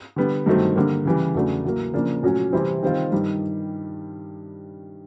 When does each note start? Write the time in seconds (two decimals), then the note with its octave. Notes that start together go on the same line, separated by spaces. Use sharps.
0.16 D3 G3 B3
0.46 G2 D#3 F#3 A3 C4
0.76 D3 G3 A#3
1.06 C#3 E3 G3
1.35 E2 C#3 F#3 A3 D4
1.64 A2 F#3 A#3
1.94 C#3 F3 A#3 D4
2.23 A#2 F#3 A3 C#4 F#4
2.53 C3 E3 G3 C4 E4
2.83 D#3 G3 C4 F4
3.12 G2 D#3 G3